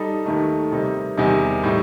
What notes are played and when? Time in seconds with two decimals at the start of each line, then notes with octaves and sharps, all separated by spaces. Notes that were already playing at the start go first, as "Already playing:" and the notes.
Already playing: G3 D#4 A4
0.25 D#2 D#3 A3 D#4
0.72 C3 D#3 G3 D#4
1.17 E2 C3 D#3 G3 D#4
1.63 A2 G3 D#4